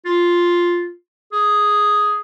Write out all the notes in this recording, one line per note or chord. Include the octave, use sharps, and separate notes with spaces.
F4
G#4